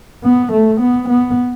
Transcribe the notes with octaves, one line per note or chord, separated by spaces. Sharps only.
B3
A3
B3
B3